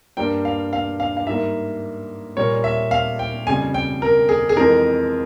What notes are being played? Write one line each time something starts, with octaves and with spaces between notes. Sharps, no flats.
G2 G3 A#3 G5
F5
F5
F5
F5
G#2 G3 A#3 E5
A#2 G3 A#3 C#5
E5
F5
G5
F2 C#3 G3 G#5
G5
A#4
G#4
G#4
F2 E3 G#3 A#4